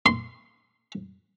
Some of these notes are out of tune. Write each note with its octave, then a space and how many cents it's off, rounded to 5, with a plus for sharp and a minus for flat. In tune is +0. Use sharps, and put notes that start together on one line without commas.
C6 -15